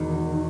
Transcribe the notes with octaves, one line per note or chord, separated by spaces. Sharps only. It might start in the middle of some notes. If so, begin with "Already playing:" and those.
Already playing: E2 B2 D#3 G#3 D#4